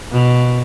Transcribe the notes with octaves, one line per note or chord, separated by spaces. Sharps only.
B2